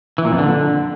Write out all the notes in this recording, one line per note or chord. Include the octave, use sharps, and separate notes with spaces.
E3
A#2
F2
D3